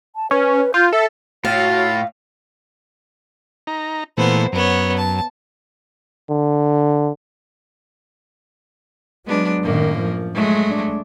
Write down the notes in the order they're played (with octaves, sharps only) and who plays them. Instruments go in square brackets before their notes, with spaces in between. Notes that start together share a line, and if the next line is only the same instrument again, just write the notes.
[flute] A5
[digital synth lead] C#4 [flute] B4
[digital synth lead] F4 [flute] G6
[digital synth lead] A4 [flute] E5
[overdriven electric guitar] A2 [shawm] F4 [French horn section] F#4 C#5 [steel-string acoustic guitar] F5
[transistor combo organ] D#4 A#5
[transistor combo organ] A#2 E3 A3 [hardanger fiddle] B3 C5
[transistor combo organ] F#2 [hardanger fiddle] B3 C#5
[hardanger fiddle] A5
[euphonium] D3
[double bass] F#3 [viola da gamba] G#3 B3 D4
[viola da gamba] F#2 A#3 [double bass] A2 D#3
[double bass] F3
[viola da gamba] F#3 G#3 A3
[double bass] D4